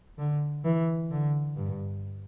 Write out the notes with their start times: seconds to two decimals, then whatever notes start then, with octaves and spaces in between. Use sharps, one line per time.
0.18 D3
0.64 E3
1.11 D3
1.57 G2